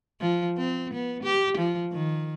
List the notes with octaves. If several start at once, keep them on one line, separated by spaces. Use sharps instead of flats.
F3
C4
B3
G4
F3
D#3